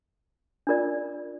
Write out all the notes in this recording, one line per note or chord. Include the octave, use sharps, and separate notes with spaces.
D4 F4 A#4 D5